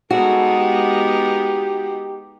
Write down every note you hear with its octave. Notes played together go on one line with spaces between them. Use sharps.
G3 G#3 B3 D#4 F#4 G#4 A4
G4